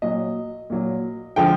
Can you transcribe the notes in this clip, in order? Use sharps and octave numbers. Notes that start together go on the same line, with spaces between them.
A#2 F#3 D#5
A#2 F#3
D3 F3 G#3 G5